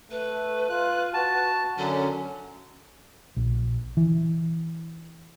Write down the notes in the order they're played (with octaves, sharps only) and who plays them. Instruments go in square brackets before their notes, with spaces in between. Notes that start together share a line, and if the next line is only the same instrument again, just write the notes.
[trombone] A3 [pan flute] B4
[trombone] F4 [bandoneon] F#6
[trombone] F#4 [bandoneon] A5
[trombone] F#2 [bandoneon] D3 F#3 [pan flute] C#4
[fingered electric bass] A#1
E3